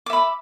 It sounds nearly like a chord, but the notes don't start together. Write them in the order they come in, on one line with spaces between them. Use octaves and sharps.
D6 E5 B5